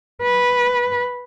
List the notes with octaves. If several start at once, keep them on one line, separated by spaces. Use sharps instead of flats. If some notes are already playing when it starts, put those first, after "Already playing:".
B4